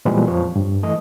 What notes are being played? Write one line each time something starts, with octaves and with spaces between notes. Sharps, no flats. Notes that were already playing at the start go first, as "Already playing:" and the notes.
A#2 E3 F3 G3 G#3 B3
F2 F3 C#5
G2
E3 A3 D#5